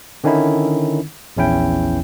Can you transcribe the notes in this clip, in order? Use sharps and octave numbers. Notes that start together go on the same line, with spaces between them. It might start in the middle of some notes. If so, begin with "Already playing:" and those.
D3 D#3 C#4 D#4 E4
A#1 E2 C#4 E4 G5